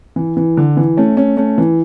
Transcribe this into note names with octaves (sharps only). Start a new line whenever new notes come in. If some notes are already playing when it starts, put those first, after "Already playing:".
E3
E3
D3
E3
A3 C#4
A3 C#4
A3 C#4
E3